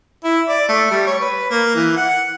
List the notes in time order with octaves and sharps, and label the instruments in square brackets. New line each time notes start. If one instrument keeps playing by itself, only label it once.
[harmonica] E4
D5
A3
G3
C#5
B4
A#3
E3
F#5